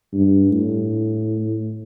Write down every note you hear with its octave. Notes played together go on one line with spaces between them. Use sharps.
G2
A2